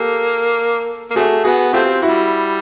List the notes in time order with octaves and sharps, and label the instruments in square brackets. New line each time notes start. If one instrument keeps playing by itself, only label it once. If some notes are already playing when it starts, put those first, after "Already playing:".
Already playing: [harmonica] A#3 [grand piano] G4 A4
[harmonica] A#3
[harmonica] C3 A3 [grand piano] F#4 G#4
[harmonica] B3 [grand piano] F#4 G#4
[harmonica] A3 C4 [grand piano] F4 G4
[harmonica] G3 [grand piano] E4 F#4